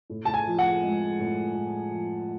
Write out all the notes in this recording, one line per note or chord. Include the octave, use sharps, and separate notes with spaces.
A2
A5
G#5
F3
F#5
G#3
A2
A2
F3